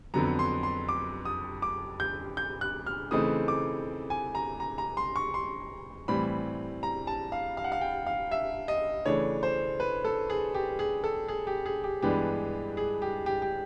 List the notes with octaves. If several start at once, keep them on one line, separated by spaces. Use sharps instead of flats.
F2 D3 F#3 B3 A#5
C6
C6
D6
D#6
D6
G6
G6
F#6
F6
C#3 E3 A3 C4 D#4 D#6
D6
G#5
A#5
A#5
A#5
C6
C#6
C6
A2 E3 G3 C4 B5
A#5
A5
F5
F5
F#5
F5
G5
F5
E5
D#5
C#3 E3 A3 D4 C#5
C5
B4
A4
G#4
G4
G#4
A4
G#4
G4
G#4
G4
G2 E3 G#3 B3 D4 G4
G#4
G4
G4
G4